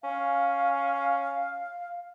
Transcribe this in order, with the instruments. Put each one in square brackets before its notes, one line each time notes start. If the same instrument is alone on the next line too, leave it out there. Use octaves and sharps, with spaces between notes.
[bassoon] C#4 [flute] F5